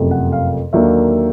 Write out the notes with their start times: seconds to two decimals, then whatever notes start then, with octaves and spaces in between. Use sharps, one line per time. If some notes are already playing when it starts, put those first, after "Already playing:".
Already playing: F#1 F2 C3 F3 A3
0.11 F#5
0.32 F5
0.73 D#2 D3 F#3 A#3 D4 E5